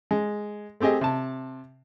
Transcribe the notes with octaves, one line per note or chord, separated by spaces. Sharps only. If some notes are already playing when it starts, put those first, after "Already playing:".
G#3
A3 C4 G4 G#4 D#5
C3 A5